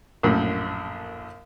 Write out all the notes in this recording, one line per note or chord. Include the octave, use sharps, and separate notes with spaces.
A#1 F#2 A2